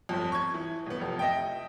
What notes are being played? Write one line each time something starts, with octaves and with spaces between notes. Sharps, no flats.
G1 F2
C#6 G#6
E3
D#1 B3
F1 F2
D#5 E5 G5